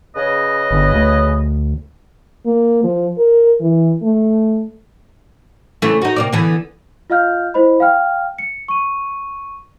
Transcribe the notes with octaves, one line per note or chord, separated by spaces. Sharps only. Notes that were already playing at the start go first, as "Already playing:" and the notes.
C#3 B4 D#5
G1
D2
A#3
F3
A#4
E3
A3
C#3 E3 A3
D#4 F#4
C3 A#3 D5
D3 E3 B3
F4 D#5 F5 F6 G6
E4 C5 D#5 B5
F5 G5 F6
C#7
C#6 D#7